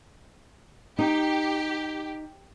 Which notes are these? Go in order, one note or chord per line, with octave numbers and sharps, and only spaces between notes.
D#4 G4